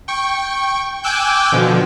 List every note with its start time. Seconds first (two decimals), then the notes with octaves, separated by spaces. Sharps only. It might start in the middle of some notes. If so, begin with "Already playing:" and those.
0.08 G5 C#6
1.03 G5 G#5 D6 E6 F#6 G6
1.52 B2 D3 F3